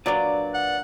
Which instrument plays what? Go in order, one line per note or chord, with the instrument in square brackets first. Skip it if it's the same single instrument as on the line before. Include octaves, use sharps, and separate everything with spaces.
[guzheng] A#2 D4 [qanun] F#3 [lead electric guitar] B4 D5
[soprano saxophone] F#5